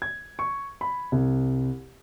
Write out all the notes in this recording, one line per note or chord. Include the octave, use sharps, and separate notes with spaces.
G#6
C#6
B5
C2